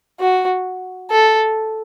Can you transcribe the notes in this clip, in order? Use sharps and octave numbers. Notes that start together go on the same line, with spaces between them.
F#4
A4